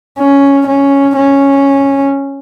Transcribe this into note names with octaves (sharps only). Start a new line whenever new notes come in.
C#4
C#4
C#4